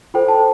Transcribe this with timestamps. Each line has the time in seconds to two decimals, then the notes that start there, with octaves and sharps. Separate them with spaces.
0.14 F4 A4 C5 G5
0.28 A5